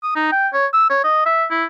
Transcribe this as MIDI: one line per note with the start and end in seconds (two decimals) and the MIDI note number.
0.03 0.12 87
0.16 0.31 63
0.32 0.48 79
0.53 0.66 73
0.73 0.87 88
0.90 1.01 73
1.04 1.24 75
1.26 1.45 76
1.51 1.65 64